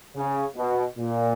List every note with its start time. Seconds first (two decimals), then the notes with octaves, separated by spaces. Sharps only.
0.16 C#3
0.56 B2
0.98 A#2